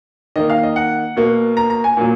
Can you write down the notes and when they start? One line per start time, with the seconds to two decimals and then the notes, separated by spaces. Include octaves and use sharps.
0.36 D#3 A#3 D#5
0.50 F5
0.63 D#5
0.76 F#5
1.16 B2 A#3
1.57 A#5
1.70 A#5
1.84 G#5
1.97 A#2 F#3